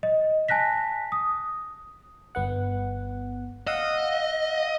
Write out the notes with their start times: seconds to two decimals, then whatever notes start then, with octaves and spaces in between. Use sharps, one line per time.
0.03 D#5
0.48 G#5 A5 F#6 A#6 B6
1.12 D#6
2.35 G1 B3 F#5
3.67 D#5 F5 F#5 E6